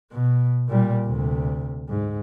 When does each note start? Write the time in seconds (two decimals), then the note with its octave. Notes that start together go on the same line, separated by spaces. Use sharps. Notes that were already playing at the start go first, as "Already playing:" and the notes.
0.12 B2
0.69 A#2 G3
1.05 D2 C3
1.89 G#2